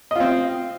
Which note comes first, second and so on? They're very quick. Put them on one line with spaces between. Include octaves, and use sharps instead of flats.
D#5 F4 C4